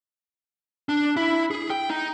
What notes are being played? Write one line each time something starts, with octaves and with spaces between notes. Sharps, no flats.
D4
E4
G#4
G5
D#4